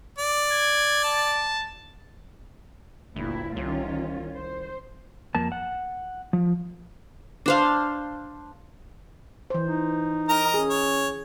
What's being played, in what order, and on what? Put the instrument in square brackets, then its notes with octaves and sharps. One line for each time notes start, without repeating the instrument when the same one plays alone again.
[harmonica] D5
[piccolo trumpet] G#6
A5
[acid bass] G1 [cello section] D2 A#2 E4
[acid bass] C2 [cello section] D#3 C#4 F4
[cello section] C5
[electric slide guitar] F2 A#3 A5
F#5
F3
[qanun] D4 C5 F5
[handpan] E3 C5
[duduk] D#4
[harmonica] A#4 D#5 A#5
[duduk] C#4 [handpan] G#4
[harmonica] C#5